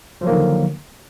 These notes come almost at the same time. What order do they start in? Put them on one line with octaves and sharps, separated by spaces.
F3 F#3 A#3 D#3 D3